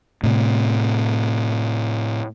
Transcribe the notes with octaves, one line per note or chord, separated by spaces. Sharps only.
A2 C3